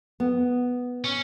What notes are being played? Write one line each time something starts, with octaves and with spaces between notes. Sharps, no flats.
B3
C#4